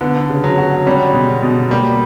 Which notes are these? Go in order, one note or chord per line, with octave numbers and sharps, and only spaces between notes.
D3 B3
C#3
F#3
F#4
G3 C#4
B2
B2
G3 A#3